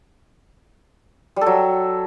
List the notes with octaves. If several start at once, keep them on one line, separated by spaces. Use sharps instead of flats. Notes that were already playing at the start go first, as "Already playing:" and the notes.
G3
A4
F#3